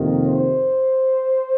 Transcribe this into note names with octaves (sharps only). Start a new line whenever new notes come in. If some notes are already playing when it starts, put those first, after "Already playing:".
Already playing: F2 C3 D#3 A#3
C5